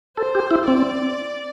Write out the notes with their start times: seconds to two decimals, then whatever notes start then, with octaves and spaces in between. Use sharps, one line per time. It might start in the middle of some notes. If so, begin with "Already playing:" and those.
0.17 A4 C5
0.35 G4
0.51 E4
0.67 C4 D5